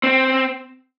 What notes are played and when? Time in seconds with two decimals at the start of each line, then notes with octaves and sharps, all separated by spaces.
0.03 C4